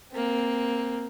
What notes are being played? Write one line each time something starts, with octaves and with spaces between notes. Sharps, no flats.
A#3 C4